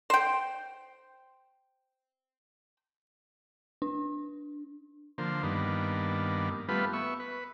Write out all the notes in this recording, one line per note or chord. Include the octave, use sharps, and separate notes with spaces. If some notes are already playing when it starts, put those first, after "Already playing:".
C5 G5
D4
D3 F3 A#3 C5
G2 D#3 A#3 B3 D4
G3 A3 B3 F4 B4
B3 E5 C#6
B4